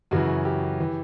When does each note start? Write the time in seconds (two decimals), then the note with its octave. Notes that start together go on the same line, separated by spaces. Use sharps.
0.11 F#2 C#3 E3 F#4
0.45 G4
0.80 E3